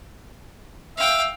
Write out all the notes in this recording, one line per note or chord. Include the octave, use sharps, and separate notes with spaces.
E5 F5 G5